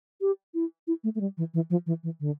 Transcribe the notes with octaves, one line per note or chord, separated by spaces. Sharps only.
G4
E4
E4
A3
A3
G3
E3
E3
F3
E3
E3
D3